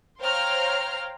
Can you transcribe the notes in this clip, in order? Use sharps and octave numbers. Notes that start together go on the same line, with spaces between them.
C5 C#5 F5 G5 A#5 F6